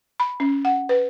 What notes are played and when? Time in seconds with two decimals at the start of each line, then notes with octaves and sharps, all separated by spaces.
0.20 B5
0.40 C#4
0.65 F#5
0.89 B4